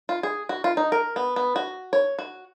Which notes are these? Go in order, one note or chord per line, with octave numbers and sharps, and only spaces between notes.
F4
G#4
F#4
F4
D#4
A#4
B3
B3
F#4
C#5
F#4